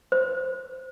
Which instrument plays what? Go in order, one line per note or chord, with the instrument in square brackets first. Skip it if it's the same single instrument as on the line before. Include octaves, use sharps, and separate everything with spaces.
[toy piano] C5